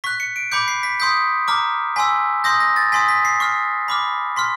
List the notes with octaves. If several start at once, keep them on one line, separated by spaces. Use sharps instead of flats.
C#6 F#6 B6
C#7
D7
B5 D6 G6 C#7
C7
B6
C6 D#6 G6 B6
A#5 D6 F6
G#5 C6 E6 B6
C6 D#6 G6 A#6
A#6
A6
G#5 C6 D#6 B6
B6
C7
C#6 F6 C7
B5 D6 F6
C6 F6 B6